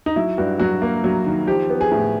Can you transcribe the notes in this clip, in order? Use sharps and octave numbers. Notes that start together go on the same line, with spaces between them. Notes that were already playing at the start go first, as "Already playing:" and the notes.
D#4
F#3 E4
G2 F#4
F#3 F#4
A#3
F#3
D#3
F3 G4
B3
G#4
A2